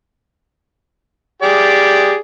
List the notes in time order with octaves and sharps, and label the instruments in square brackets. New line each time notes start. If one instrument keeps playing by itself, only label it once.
[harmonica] G4 G#4 D5